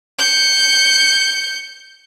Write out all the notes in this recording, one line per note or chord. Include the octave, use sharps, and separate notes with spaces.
G6 C#7